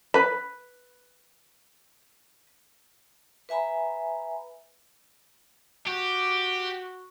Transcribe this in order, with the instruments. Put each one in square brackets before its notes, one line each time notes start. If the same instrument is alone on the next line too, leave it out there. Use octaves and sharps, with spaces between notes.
[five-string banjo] B4 B5
[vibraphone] B4 E5 G#5 A#5 B5
[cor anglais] F#4 [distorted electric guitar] G4